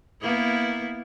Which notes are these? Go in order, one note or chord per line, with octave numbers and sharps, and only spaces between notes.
A#3 B3 E4